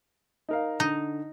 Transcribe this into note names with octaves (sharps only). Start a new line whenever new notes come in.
D#4 A#4 F5
D3 D#4